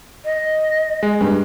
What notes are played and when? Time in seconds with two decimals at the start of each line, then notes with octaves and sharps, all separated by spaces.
0.25 D#5
1.03 G#3
1.21 G2